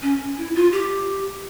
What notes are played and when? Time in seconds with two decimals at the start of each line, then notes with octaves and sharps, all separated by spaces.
0.02 C#4
0.38 E4
0.55 F4
0.72 G4